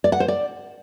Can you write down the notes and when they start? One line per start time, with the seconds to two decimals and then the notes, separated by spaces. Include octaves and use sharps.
0.04 D5
0.12 F#5
0.20 C5
0.28 D5